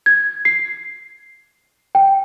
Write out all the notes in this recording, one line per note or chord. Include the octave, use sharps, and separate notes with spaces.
G#6
C7
G5